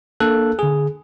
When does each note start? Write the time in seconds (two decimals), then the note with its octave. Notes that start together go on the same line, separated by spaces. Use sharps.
0.20 A#3 D4 A4 F#6
0.59 D3 G#4